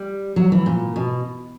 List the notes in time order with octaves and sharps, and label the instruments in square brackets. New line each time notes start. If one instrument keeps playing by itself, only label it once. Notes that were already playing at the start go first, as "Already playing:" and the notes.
Already playing: [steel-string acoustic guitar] G3
F#3
E3
A#2
B2